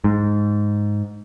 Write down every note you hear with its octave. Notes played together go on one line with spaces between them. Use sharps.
G#2